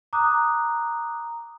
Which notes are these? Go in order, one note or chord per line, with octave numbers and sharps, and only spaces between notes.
A#5 D6 D#6 F#6